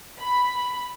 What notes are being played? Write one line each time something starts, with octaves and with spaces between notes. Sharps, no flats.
B5